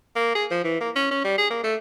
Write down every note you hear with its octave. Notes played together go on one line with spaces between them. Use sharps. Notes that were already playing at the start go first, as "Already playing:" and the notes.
A#3
G#4
F3
E3
A#3
C#4
C#4
G3
G#4
A#3
A3